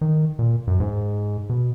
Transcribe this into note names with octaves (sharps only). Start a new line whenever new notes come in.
D#3
A#2
F#2
G#2
B2